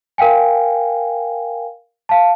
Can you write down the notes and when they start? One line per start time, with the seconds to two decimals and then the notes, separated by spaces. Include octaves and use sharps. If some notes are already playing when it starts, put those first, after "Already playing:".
0.18 A#4 F5 G5 G#5
2.09 F5 A5